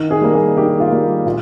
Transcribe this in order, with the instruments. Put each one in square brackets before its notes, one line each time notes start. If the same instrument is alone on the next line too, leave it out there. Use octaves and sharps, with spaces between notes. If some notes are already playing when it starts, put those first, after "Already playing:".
Already playing: [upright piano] D#3
G#4
G3 A#3
G#4
D#3 G4
F4
G3 A#3
A#2 F4